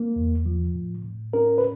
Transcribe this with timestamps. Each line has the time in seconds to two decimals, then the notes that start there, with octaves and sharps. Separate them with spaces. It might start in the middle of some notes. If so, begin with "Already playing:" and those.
Already playing: A#3
0.16 E2
0.46 F3
0.74 A2
1.05 A2
1.33 C#4 A#4
1.58 B4